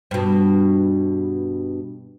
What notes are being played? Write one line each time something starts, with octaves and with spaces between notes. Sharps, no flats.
G2 B2